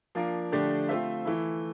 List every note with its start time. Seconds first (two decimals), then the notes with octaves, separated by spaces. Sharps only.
0.15 F3 A#3 D4 F4 A#4
0.52 D3 F3 A3 D4 G4
0.89 A3 C4 F4 C5 E5
1.25 E3 A3 E4